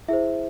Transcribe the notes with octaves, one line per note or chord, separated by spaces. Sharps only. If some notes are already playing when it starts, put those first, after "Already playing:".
E4 G#4 C5 E5